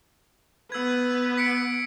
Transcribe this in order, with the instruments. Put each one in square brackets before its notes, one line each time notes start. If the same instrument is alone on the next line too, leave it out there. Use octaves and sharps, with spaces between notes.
[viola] B3 B4 [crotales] E6 G#6
[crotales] B6 C#7 D7